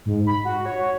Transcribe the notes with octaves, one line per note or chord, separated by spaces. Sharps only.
G#2
B5
F#4
C#5